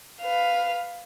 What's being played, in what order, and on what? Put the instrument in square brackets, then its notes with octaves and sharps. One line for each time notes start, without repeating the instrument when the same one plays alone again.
[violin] B4 F5